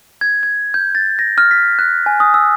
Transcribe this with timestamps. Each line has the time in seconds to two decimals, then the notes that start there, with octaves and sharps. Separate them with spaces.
0.21 G#6
0.43 G#6
0.74 G6
0.95 A6
1.19 A#6
1.38 F6
1.51 B6
1.79 F#6
2.06 G#5
2.20 D#6
2.34 E6